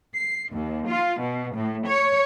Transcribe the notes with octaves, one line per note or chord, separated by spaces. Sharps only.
C7
D#2
F4
B2
A2
C#5